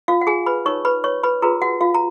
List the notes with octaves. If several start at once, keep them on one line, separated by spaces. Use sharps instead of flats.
F4 F5
F#5
G#4 G#5
B4 B5
D#4 A#4 C#5 C#6
B4 B5
C#5 C#6
B4 B5
F4 G#4 A#4 B4 A#5
F#4 F#5
F4 F5
A#5